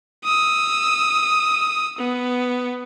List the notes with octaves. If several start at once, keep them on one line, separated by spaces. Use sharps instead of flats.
D#6 E6
B3